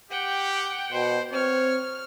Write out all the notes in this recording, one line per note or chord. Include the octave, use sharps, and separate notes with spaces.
G4 F#5 G5
B2 C5
C4 C#5 F6